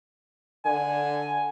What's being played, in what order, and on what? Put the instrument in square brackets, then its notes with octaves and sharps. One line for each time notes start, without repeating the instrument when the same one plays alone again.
[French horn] D3 [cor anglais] G#5